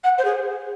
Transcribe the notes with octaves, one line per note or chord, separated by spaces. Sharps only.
F#5
C5
G#4